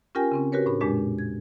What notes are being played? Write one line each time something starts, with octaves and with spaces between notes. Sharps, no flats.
C#4 F4 G4 A#4 G5 G#5
C#3 C4 C#4
F#4 G4 A#4 B4 C#5
A2 D4 B5
F2 A#2 G#3 D4 G4
G#6